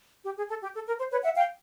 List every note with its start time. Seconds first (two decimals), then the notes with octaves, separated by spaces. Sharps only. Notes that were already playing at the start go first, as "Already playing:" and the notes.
0.24 G4
0.37 G#4
0.48 A4
0.61 G4
0.74 A4
0.86 A#4
0.99 C5
1.11 B4 C#5
1.23 E5 F#5
1.36 F5 G5